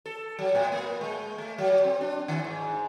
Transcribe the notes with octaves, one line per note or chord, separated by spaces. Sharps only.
A4
F#3
A2
A#3
G#3
A3
F#3
C4
D4
D#3
G#2